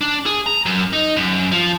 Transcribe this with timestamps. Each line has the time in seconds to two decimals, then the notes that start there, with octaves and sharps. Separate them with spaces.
0.01 D4
0.26 G#4
0.46 A#5
0.66 F#2
0.93 D#4
1.16 F#2
1.52 F3